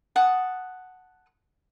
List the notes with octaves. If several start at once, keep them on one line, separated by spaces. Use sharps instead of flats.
F#5 A5 D#6